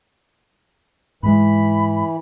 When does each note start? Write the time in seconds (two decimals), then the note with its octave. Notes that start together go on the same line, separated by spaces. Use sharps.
1.23 G#2 E3 G#3 B5